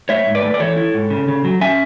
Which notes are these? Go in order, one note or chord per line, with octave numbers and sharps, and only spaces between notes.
A3 C#5 E5
G#2
B4 D5
A3
D5
E3 A4 C#5
E4
G#2
C#3
C#3
F#3
C#4 E5 G#5